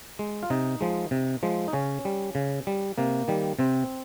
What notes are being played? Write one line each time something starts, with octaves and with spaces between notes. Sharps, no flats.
G#3
F4
C3 D#4
F3 G#3
C3
F3 G#3
D#4
C#3 C#4
G3
C#3
G3
C3 A#3
D#3 G3
C3 C4